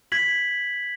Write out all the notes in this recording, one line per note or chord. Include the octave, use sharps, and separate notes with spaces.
G#6 B6 F#7